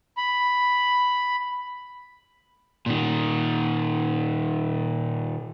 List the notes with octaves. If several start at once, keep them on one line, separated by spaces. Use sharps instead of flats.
B5
A#2 D#3